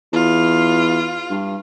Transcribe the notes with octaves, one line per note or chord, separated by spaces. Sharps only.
E2 F4
G2